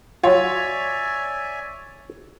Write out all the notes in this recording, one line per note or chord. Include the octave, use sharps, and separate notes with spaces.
F#3 F4 C#5 D5 E5 G#5